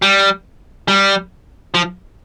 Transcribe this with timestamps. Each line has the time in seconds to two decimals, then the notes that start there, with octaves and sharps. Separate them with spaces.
0.02 G3
0.88 G3
1.74 F3